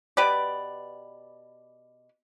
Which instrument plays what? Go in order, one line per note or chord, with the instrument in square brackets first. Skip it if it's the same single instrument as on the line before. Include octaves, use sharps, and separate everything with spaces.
[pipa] B2 G4 B4 D5